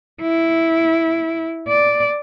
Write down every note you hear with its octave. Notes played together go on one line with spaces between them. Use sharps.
E4
D5